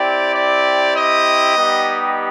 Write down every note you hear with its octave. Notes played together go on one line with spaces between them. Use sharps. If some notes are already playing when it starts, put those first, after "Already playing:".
Already playing: C4 E4 G4 D5
D5
D#5
G3 B3 D#4 G4